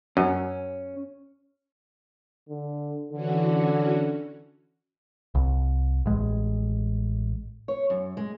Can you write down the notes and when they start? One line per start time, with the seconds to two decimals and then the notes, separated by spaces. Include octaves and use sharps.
0.17 F#2 C#4
2.49 D3
3.13 D3 E3 C#4 F#4
5.35 C2
6.06 A1 G#3
7.68 C#5
7.90 F#2
8.17 G#3